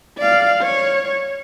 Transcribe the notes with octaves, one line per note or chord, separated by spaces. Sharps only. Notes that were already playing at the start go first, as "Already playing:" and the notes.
D5 F5
C#5